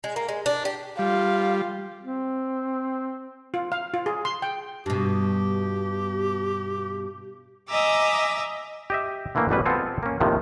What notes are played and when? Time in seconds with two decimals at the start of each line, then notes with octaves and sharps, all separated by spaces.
0.04 G#3
0.16 A#3
0.29 G#3
0.46 D4
0.65 G4
0.99 G3 F4 F5
2.03 C4
3.54 F4
3.72 F5
3.94 F4
4.06 G#4
4.25 C6
4.42 G5
4.86 G2 B2 G4
7.68 D#5 E5 G#5 A#5 D6 E6
8.90 G4 D#5 E5
9.35 D3 E3 A3 A#3
9.49 A1 B2 G3 B4
9.65 B3 C4 F4 A4 G#5 A5
10.03 A#3 C#4
10.20 D#2 A2 C3 D#3 F3